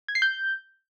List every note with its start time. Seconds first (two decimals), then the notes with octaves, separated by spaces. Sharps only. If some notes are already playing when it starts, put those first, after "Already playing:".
0.08 G#6
0.15 C7
0.22 G6